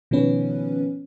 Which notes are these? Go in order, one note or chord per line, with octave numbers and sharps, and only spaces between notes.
B2 D#3 F3 B3 C#4 B4